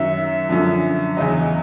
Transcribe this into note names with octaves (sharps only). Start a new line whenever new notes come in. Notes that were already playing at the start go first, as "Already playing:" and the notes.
Already playing: F#2 D#3 F#3 E5
F#2 D3 F3
E2 C#3 F#3 D#5